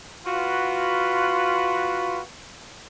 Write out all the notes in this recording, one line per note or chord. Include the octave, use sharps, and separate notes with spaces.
F4 F#4 B4